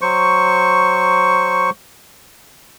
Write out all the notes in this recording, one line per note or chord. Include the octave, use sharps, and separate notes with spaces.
F#3 C5 C#6